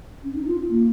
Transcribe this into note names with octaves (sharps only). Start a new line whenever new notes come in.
C#4
D#4
F4
A#3